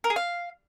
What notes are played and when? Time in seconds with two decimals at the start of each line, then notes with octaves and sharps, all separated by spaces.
0.04 A#4
0.10 G#4
0.16 F5